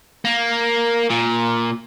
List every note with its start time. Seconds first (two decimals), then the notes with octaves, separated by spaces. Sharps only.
0.25 A#3
1.10 A#2